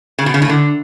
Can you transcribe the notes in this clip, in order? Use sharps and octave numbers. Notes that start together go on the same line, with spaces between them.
C#3
B2
C#3
A2
D3